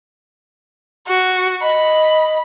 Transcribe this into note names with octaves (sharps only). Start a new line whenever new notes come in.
F#4
D#5 B5